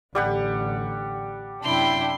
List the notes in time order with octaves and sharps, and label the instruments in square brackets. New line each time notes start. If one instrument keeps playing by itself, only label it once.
[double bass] A1 D3 [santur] G3 G4 F#5
[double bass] F#2 C3 [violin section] D4 E4 G5 [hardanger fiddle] C6